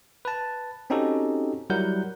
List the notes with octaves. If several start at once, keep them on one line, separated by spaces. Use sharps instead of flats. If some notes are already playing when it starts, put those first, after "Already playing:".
B4 A5
C4 C#4 D#4 F#4 G4 A4
F#3 G3 E4 A#4 F#5 G6